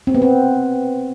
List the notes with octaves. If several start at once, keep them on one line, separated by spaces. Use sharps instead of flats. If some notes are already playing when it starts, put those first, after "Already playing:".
C4
B3
C4